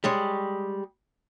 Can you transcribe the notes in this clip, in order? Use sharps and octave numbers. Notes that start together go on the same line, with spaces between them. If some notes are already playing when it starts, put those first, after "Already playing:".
G3 G#3 C#5